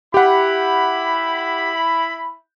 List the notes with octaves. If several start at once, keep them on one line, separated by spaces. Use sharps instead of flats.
E4 G4 F#5 B5